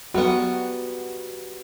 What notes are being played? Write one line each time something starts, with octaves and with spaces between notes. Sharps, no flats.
F#3 G3 B3 F#4